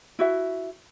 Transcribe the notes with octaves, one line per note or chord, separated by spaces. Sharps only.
E4 F#4 E5